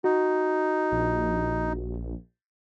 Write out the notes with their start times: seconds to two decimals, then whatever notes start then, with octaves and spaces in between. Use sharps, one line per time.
0.04 D#4 F#4
0.91 A#1